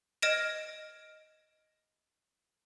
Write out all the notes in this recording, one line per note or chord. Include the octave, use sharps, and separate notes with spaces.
D#5 F6 A#6 D7 E7